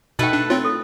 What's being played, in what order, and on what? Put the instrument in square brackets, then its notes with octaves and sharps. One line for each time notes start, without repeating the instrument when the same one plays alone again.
[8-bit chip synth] B2 [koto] A3 B4 F#5 [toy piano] D#4 G5
[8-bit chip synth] D4
[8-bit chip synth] C4 F4 [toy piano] C#5
[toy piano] A4